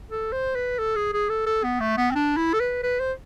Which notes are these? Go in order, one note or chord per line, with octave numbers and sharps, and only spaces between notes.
A4
C5
B4
A4
G#4
G#4
A4
A4
B3
A3
B3
C4
D4
E4
A4
B4
B4
C5